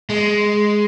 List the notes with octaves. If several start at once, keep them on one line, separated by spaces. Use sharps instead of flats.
G#3